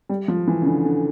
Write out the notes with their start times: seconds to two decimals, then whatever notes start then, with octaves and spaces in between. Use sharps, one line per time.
0.09 G3
0.28 F3
0.47 E3
0.62 C#3
0.66 D3
0.85 D3